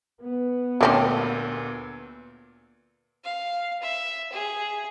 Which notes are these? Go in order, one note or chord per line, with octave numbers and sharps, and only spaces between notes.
B3
D2 A#2 G3 C4 C#4
F5
E5
G#4